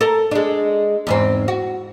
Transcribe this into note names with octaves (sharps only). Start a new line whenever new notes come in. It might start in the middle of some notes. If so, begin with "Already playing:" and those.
A4 A#4
G#3 D4
E2 G#2 C4
F#4